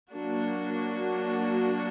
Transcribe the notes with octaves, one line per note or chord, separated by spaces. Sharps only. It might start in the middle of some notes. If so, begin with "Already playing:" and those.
F#3 A#3 D4 F#4